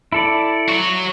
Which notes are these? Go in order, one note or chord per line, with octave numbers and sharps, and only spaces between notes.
E4 A4 D5
F#3 F#4